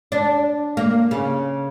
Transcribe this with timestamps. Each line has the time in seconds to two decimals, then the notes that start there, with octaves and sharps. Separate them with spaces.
0.12 D4
0.77 A#3
1.11 C#3